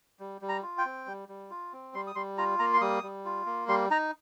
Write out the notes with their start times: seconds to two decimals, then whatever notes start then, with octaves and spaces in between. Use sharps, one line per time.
0.19 G3
0.41 G3
0.49 A#5
0.63 F4
0.78 G5
0.85 C4
1.07 G3
1.29 G3
1.50 F4
1.73 C4
1.94 G3 C6
2.07 D#6
2.15 G3 C6
2.38 F4 A#5
2.59 A#3 A#5
2.74 C6
2.81 G3 D#6
3.03 G3
3.25 F4
3.46 A#3
3.68 G3 C6
3.91 D#4 A#5